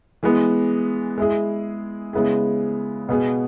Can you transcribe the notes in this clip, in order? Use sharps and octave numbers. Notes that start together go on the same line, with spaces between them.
E3 G#3 B3
G#3 E4 G#4
C#3 G#3 B3 E4 G#4
B2 B3 G#4